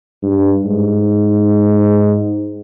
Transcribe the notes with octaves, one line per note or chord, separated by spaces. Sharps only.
G2
G#2